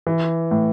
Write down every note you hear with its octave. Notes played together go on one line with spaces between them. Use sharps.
E3
A2